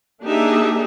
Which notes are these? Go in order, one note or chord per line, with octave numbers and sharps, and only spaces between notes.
A#3 D4 D#4 G4 G#4 E5